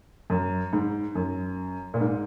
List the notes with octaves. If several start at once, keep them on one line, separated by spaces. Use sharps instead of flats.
F#2
G#2
F#2
A#2
G#2